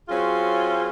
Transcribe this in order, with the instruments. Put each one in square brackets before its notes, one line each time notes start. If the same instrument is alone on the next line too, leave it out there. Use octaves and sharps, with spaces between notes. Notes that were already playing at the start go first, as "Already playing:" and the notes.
[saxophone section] F#3 C4 C#4 F4 G#4